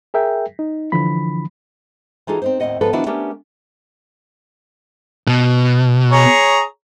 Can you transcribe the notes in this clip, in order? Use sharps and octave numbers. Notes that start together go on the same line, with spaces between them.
G#4 A#4 E5 G5
D#4
D3 E3 F3 B5
E3 D#4 F4 F#4 G#4 A4
C4 D#4 C5
D#2 A2 C3 C4 D#5 F#5
G#2 F3 B3 A4 B4
D#3 F3 B3 D4 E4 F#4
A3 B3 C#4 D4 G4 A#4
B2
G#4 C#5 A#5